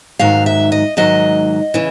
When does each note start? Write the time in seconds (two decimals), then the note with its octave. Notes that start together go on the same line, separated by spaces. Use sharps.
0.19 G#2 D#3 F#3 F5
0.46 E5
0.72 D#5
0.97 G#2 D#3 F#3 D#5
1.74 C#3 E3